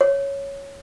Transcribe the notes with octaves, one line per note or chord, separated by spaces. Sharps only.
C#5